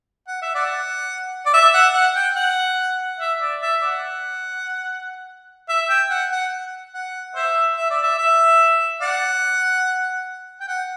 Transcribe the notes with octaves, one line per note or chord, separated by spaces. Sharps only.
F#5
E5
D5 F#5
D5
E5
F#5
F#5
G5
F#5
E5
D5
E5
D5 F#5
E5
G5
F#5
F#5
F#5
C5 E5
E5
D5
E5
E5
D5 F#5
G5
F#5